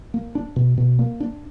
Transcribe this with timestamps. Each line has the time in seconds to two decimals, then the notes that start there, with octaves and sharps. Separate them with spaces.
0.14 A#3
0.35 D4
0.56 B2
0.78 B2
0.99 A#3
1.20 D4